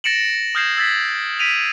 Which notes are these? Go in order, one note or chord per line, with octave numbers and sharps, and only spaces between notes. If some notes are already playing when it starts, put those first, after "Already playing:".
A6 A#6 C#7 D7 E7 F#7
D#6 F6 G6 G#6 C7 E7
E6 G#6 A6 B6
B6 D7 D#7 F7